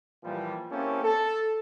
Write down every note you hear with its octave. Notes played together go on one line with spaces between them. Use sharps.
A#2 E3 F3 G3
A#3 C4 C#4 E4 G4 A4
A4